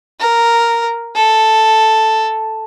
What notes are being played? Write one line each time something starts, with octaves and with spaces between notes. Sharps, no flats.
A#4
A4